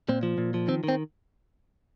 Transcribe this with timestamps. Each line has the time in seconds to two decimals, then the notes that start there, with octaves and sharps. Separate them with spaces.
0.09 A#2 C4
0.23 F3
0.38 A#2
0.54 F3
0.68 D#3 C4
0.84 D#3 C4